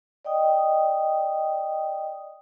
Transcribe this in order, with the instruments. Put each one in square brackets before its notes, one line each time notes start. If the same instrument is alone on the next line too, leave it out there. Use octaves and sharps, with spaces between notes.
[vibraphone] D5 D#5 G5 D#6